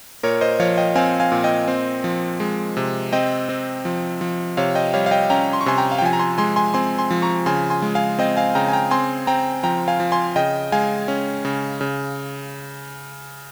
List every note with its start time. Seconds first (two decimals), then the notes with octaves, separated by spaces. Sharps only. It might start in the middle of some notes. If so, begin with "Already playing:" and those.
0.23 A#2 A#4 C#5
0.41 C5 D#5
0.60 F3 C#5 F5
0.77 D#5 G5
0.95 C4 F5 G#5
1.20 F5 G#5
1.32 A#2
1.44 D#5 G5
1.68 C4
2.04 F3
2.40 G#3
2.77 C3
3.12 C4 D#5 G5
3.49 C4
3.85 F3
4.21 F3
4.57 C3 C#5 F5
4.75 D#5 G5
4.93 G3 C#5 F5
5.06 F5
5.11 D#5 G5
5.30 C#4 G5 A#5
5.53 C6
5.61 C#6
5.66 C3 G#5 C6
5.78 G5 A#5
5.92 F5
5.98 G5
6.02 F3 G#5
6.13 A#5
6.19 G#5 C6
6.38 G#3 G#5 C6
6.56 G#5 C6
6.74 C4 G#5 C6
6.98 G#5 C6
7.11 F3
7.22 A#5 C#6
7.46 C#3 G#5 C6
7.70 G#5 C6
7.82 G#3
7.95 F5 G#5
8.19 C4 D#5 G5
8.37 F5 G#5
8.55 C#3 G5 A#5
8.68 G#5
8.73 G5 A#5
8.91 C4 G#5 C6
9.27 C4 G5 A#5
9.63 F3 G5 A#5
9.88 F5 G#5
10.00 F3
10.12 G#5 C6
10.36 C#3 D#5 G5
10.72 G#3 F5 G#5
11.08 C#4
11.45 C#3
11.81 C#3